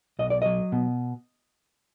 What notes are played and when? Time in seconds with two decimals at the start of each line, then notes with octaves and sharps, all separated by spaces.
0.19 B1 D#5
0.30 D5
0.42 F#3 D#5
0.72 B2